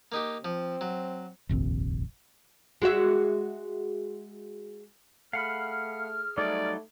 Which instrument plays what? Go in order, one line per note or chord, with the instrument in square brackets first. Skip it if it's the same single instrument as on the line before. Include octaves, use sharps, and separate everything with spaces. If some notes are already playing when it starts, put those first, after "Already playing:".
[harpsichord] A#3 D#4 G4
[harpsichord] F3 [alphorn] C4
[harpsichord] F#3
[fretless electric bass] F1 A#1 D#2 C4
[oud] G#3 F#4 E5
[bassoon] A3 [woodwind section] G#4 F6 [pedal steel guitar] F5 F#5 B5
[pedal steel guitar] F#3 G3 D#4 [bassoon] A3 [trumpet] D5